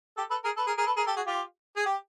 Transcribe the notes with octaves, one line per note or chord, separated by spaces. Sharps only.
G4 A4
A4 B4
G#4 A#4
A4 B4
G#4 A#4
G#4 A#4
A4 B4
G#4 A#4
G4 A4
F#4 G#4
F4 G4
G#4
G4